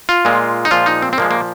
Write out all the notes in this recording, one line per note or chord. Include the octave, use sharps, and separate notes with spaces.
F4
A#2 G#3
D#4
A#2 F3 G#3 F4
D#4
C4
C4
A#2 F3 G#3 A#3
A#3